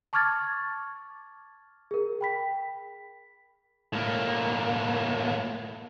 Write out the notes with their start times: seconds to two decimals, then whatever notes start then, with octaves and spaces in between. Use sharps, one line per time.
0.13 A5 C#6 D6 F6 G#6 A6
1.91 G#4 A#4
2.21 G5 B5 B6
3.93 A2 A#3